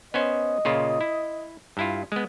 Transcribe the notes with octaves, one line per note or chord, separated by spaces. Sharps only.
B3 C#4 C5 D#5
A#2 C#3 F4
E4
G2 E4 F4
G#3 B3